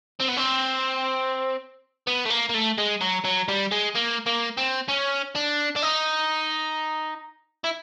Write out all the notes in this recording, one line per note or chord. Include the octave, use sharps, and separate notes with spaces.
C4
B3
C4
B3
A3
A#3
A#3
A3
G#3
F#3
F#3
G3
G#3
A#3
A#3
C4
C#4
D4
D4
D#4
E4